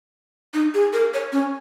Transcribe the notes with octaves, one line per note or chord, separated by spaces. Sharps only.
D#4
G#4
A#4
C#5
C#4